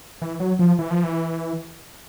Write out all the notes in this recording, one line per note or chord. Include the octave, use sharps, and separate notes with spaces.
E3
F#3
F3
E3
F3
E3